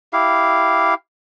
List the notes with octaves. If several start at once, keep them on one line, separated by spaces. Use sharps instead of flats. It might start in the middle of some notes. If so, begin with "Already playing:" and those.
E4 G4 F5